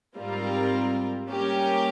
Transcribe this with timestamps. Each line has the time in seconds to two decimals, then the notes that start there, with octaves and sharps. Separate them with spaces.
0.17 G#2 G3 C4 F4 A#4
1.29 G3 A#3 C#4 G4 A#4